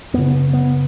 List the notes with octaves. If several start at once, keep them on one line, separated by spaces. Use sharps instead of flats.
F#2 C#3 B3
B3